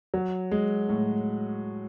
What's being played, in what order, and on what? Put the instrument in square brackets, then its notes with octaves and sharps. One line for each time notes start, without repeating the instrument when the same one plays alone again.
[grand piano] F#3
G#3
A2